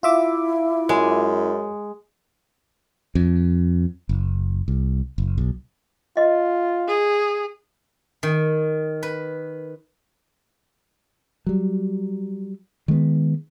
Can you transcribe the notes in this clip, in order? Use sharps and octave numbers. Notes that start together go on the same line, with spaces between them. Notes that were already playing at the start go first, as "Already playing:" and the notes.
E4 F4 E5 D6
F#2 G#3
F2
F#1
C2
F#1
B1
F4 D#5
G#4
D#3
B4
F#3 G3
D#3 G#3 A#3 B3